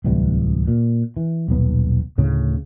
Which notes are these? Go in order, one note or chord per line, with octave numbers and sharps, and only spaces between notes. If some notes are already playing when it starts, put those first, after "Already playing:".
D1 C2 E3 G3
A#2
E3
D#1 B1 B3
D2 A2 C#3